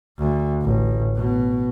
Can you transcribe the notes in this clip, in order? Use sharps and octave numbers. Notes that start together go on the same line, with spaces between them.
D2
A1
B2